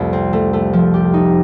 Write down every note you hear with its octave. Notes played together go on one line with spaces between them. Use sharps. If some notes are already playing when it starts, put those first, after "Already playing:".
Already playing: C2 F2 A3
C4
A3
A3
F3
G4
D#4